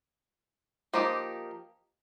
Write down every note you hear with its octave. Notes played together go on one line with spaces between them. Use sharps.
F3 A#3 D#4 G4